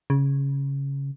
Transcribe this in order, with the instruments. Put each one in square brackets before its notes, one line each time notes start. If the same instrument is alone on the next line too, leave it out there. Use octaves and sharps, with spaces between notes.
[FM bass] C#3